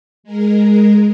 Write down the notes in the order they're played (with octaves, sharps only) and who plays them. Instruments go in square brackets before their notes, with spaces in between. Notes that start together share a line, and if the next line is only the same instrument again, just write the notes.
[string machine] G#3 A#4